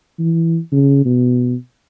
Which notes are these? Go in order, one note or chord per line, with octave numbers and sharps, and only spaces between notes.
E3
C#3
B2